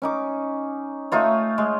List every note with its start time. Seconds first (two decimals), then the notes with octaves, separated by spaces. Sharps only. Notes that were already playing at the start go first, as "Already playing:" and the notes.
0.02 C#4 D#4 D6
1.12 A3 D#4 F4 C#5
1.58 G#3